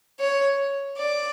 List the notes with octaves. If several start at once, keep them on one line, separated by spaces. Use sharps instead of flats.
C#5
D5